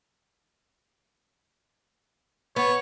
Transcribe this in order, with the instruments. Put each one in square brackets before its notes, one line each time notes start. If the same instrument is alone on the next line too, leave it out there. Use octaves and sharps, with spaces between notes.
[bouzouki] B3 [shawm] C#5